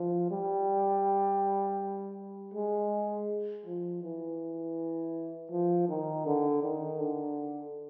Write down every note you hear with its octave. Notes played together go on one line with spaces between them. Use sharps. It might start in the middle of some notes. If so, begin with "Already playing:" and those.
Already playing: F3
G3
G#3
F3
E3
F3
D#3
D3
D#3
D3